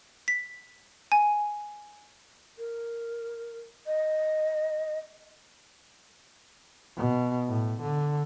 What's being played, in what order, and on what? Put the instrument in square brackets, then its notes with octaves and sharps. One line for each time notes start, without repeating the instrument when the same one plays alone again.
[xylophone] B6
G#5
[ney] A#4
D#5
[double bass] B2
A2
D3